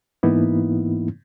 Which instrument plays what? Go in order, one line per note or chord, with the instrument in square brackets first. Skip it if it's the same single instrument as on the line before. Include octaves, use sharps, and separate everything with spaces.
[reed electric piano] G#2 E3 A#3 B3 D#4 E4